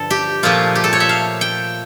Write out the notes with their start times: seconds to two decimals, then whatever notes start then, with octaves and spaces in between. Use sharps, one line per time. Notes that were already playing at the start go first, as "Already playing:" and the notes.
Already playing: G2 D3 F3 A4
0.10 G4
0.43 A#2 F3 A3 F4
0.75 G4
0.84 A4
0.93 C#5
1.00 E5
1.09 F5
1.41 G5